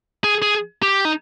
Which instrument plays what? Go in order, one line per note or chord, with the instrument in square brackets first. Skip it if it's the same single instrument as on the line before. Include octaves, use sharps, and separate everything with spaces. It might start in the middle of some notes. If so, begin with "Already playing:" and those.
[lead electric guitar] G#4
G#4
G4
D#4